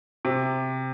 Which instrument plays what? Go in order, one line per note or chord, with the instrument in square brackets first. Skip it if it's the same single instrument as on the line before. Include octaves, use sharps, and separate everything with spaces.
[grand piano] C3